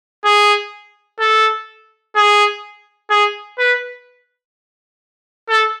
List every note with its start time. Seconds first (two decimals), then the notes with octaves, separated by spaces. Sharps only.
0.25 G#4
1.20 A4
2.16 G#4
3.10 G#4
3.58 B4
5.49 A4